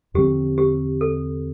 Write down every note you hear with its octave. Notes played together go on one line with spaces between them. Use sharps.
E2 D3 F3 C4 G4
G4
A4